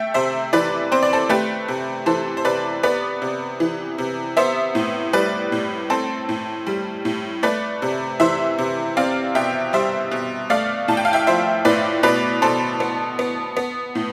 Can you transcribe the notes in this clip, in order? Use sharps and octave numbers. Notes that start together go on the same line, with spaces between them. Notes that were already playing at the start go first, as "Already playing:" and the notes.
Already playing: A3 E5 G5
C3 C5 E5
E3 B4 D5
C4 C5
D5
A4 C5
A3 G4 B4
C3
E3 A4 C5
C5
C3 B4 D5
B3 B4 D5
C3
E3
C3
B3 C5 E5
A2
G3 B4 D5
A2
C4 A4 C5
A2
G3
A2
A3 B4 D5
C3
E3 C5 E5
C3
C4 D5 F5
B2 E5 G5
G3 C5 E5
B2
A3 D5 F5
A2 A5
G5
F5
E5 G5
F3 C5 E5
A2 B4 D5
B2 B4 D5
B2 A4 C5
B3
B3
B3
A2